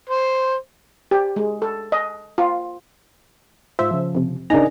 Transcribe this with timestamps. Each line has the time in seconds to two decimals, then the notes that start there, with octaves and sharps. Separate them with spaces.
0.09 C5
1.11 G4
1.36 G#3
1.62 A4
1.92 D#5
2.38 F4
3.79 G#2 F4 C5 E5
3.91 C#3 F3
4.15 F2 C3
4.50 C#3 D4 D#4 A#4 D#5 G#5 A#5